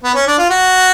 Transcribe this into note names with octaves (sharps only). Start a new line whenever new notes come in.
B3
C#4
D4
F4
F#4